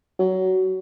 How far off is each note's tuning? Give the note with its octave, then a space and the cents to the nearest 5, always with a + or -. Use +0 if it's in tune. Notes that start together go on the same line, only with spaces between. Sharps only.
F#3 +20